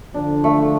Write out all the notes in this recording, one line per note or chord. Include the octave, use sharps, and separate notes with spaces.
D3 F3 D4
A3